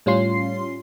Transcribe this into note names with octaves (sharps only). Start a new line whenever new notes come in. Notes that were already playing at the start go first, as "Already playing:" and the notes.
A2 G3 C#4 F4 C6 C7